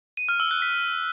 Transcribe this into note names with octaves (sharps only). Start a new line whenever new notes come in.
D#7
F6
E6
F#6
B6